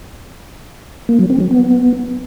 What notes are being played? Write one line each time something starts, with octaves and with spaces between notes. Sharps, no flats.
A#3
F#3
C4
F#3
B3